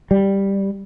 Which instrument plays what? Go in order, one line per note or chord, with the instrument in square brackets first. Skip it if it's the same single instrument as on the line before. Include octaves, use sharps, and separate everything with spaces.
[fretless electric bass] G3